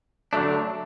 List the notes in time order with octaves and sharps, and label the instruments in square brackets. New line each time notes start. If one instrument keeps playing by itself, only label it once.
[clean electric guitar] D3 F#3 A3 D4